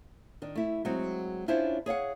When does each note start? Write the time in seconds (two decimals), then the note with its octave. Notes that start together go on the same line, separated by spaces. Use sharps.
0.42 D#3 D4
0.55 A3 E4
0.85 F#3 G#3 C4 F#4
1.48 C#4 D4 E4 F4 C5 C#5
1.86 G#4 C#5 F5 F#5